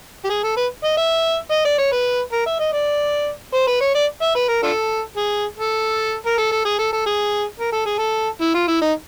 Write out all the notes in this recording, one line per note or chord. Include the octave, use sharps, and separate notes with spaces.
G4
G#4
A4
B4
D#5
E5
D#5
D5
C#5
B4
A#4
E5
D#5
D5
C5
B4
C#5
D5
E5
B4
A#4
D4 F4 A4
G#4
A4
A#4
A4
A4
G#4
A4
A4
G#4
A#4
A4
G#4
A4
E4
F4
E4
D#4